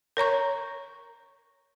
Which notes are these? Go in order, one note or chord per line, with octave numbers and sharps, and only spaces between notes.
A#4 C#5 A#5 C#6